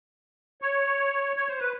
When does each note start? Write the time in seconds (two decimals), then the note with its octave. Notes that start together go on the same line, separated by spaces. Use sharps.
0.62 C#5
1.36 C#5
1.49 C5
1.60 B4